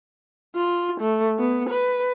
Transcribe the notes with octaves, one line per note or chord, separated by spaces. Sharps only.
F4
A3
B3
B4